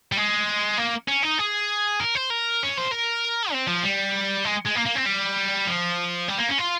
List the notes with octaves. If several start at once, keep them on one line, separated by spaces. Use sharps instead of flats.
G3
G#3
A#3
C#4
D#4
G#4
A#4
C5
A#4
C#5
C5
A#4
C4
F3
G3
G#3
G#3
A#3
A#3
C4
G3
F3
G3
A#3
C#4
F4